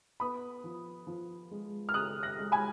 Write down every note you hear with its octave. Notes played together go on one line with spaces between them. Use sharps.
B3 B5 D#6
F3
F3
G#3
F6
C#3 D#6 F#6
F#6 A#6
G#3
G#5 B5